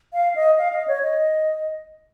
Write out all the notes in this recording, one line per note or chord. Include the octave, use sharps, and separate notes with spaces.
F5
D#5
F5
D#5
C#5
D#5